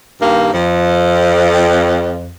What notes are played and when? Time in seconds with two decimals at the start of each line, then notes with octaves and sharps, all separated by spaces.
0.21 G2 D#3 A#3
0.53 F2